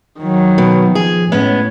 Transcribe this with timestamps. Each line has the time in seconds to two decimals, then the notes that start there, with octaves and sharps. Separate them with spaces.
0.20 D#3 F#3
0.58 B2
0.95 F3 G#4
1.32 A2 G#3 B3 C#4